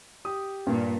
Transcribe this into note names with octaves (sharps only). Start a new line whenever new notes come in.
G4 D#6
G2 A#2